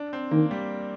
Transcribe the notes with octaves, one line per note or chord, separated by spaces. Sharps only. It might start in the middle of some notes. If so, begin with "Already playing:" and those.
Already playing: D4
C4
D#3 A#3
G3